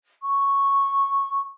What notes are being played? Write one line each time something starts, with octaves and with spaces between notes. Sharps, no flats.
C#6